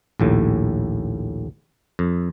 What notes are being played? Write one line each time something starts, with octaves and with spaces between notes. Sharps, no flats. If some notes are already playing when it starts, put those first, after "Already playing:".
A#1 D#2 A2
F2